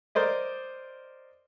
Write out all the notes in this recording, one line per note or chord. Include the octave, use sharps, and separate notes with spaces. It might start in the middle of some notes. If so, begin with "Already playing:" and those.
A#4 C5 D5 D#5